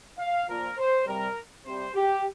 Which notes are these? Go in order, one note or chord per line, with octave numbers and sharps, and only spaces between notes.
F5
A#2 F3 A#4
C5
C3 G3 A#4
C3 G3 C5
G4